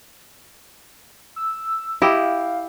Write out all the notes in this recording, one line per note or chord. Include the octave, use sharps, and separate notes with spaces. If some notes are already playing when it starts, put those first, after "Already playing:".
E6
E4 G4 D#5 F5